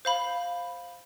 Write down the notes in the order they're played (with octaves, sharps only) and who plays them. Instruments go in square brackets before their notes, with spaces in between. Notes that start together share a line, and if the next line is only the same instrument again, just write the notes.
[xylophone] C5 F5 B5